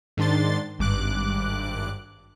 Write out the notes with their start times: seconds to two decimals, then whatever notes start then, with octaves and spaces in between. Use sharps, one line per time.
0.17 G#2 D#3 D4 C6 A6
0.79 G#1 G2 D6 F#6